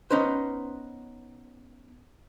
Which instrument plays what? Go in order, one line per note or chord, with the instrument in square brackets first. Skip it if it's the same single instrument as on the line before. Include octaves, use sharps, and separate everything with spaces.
[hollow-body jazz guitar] B3 C#4 D#4 B4 C5